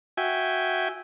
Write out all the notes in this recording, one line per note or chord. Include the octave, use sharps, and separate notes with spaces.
F#4 E5 G5 G#5